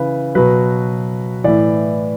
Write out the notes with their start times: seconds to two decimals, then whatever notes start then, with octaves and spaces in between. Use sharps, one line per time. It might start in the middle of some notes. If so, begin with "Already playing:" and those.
Already playing: C#3 E3 B4
0.35 B2 F#3 B4
1.44 A2 E3 D5